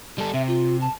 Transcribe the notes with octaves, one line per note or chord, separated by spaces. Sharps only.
G3 A4
C3 E5
F4
A5